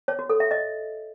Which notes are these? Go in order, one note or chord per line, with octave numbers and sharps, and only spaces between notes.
C#5
F#4
A4
E5
D#5